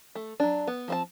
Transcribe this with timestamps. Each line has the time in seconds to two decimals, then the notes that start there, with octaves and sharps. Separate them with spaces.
0.15 A3
0.40 F#3 D4
0.67 B3
0.88 F3 C4 A5